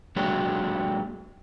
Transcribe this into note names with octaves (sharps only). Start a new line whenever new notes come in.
F#3 G#3 A#3 D4 F#4 G4